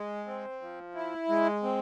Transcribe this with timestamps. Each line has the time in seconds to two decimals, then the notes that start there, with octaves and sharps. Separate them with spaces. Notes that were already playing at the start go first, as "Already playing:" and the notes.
Already playing: G#3
0.27 C4
0.61 F3
0.95 E4
1.29 G#3
1.63 C4